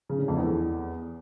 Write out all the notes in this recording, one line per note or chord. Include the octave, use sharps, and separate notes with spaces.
C#3
D3
F2
E2